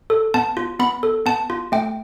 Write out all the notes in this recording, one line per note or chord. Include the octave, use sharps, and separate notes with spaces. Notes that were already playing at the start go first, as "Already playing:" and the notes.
A4
B3 A5
F4
B3 B5
A4
B3 A5
F4
A3 G5